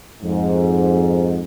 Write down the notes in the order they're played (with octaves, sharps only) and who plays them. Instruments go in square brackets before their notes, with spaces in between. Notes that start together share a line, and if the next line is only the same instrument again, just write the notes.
[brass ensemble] F2 G#2